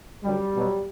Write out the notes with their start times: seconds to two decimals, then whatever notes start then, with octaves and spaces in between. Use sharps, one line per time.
0.23 F#2 D3 F#3 G3
0.54 B2 F#3